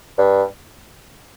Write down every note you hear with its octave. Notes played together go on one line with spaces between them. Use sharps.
G2